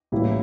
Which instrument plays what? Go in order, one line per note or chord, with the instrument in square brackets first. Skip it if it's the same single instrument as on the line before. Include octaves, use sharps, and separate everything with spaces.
[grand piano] A1 A2 G3 A#3 E4